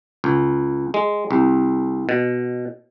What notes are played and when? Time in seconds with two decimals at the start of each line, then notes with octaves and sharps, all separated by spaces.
0.24 C#2
0.94 G#3
1.31 C2
2.09 B2